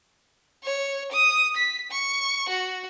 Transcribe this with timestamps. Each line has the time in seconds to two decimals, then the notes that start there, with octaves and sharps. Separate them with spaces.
0.63 C#5
1.12 D#6
1.57 B6
1.91 C#6
2.49 F#4